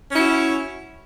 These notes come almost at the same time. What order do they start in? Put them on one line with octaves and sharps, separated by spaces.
C#4 E4 F#4